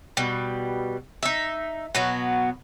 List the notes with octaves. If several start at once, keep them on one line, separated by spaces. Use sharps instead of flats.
B2 G3
D#4 E5
B2 F#3 B3